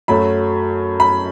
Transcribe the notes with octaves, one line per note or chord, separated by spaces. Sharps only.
F#2 F#3 A3 B5
B5